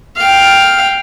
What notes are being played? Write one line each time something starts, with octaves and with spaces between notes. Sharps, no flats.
F5 G5